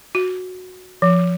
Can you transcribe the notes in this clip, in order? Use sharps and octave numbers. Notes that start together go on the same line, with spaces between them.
F#4
F3